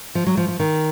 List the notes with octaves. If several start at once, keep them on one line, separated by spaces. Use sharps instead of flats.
F3
F#3
F3
F3
D#3